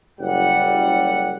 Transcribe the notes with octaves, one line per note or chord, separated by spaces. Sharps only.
F#1 G3 F#5